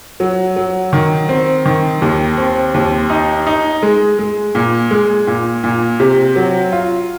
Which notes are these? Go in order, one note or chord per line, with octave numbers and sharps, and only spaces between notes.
F#3
F#3
D#3
C4
D#3
D#2
C4
D#2
D#4
D#4
G#3
G#3
A#2
G#3
A#2
A#2
C3
F#3
F4